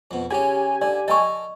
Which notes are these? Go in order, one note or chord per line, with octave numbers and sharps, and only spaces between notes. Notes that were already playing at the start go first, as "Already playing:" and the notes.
F2 B2
C#3 C#4 G4 G#5
D3 D5
A4 A#4 D#5 A5 C#6